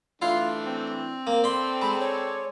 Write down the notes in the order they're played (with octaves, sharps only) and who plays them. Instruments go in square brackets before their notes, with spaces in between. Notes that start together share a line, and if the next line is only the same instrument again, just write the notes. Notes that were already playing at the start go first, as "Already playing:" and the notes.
[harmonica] E3 A3 D4 [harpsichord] E4 [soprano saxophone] F4
[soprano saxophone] C4
[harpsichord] A#3
[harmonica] A4 D5 [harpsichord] B5 C6
[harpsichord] G#3 [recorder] B5
[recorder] C#5